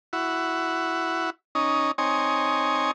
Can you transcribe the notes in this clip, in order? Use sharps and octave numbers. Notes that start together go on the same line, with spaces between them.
E4 F#4
C#4 D#4
C4 D#4 C#5 G#5